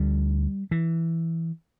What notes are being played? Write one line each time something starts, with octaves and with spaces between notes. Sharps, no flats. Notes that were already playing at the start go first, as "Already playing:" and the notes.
Already playing: D2 D3 G3
E3